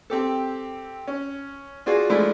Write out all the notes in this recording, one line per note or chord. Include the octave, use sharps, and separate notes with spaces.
C4 G4 A4
C#4
D4 F4 F#4 G#4
F3 G#3 A3 D4 E4